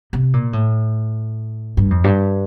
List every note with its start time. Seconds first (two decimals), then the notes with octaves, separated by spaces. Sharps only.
0.13 C3
0.33 A#2
0.53 A2
1.77 G2
1.91 F2
2.04 G2